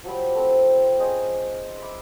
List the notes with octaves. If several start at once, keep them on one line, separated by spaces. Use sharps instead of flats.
F3 F#3 G4 B5
A3 C4
C#4 G#4 C5 D#5
E5 B5 D6